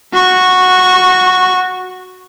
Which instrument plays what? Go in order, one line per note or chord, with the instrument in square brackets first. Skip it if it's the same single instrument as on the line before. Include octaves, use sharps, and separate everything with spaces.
[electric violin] F#4 C#6